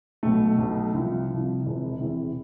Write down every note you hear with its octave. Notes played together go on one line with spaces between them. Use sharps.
B1 B2 A3
B1 B2 A3
C2 C3 F3
C2 C3 F3
E1 E2 C3 E3
E1 E2 C3 E3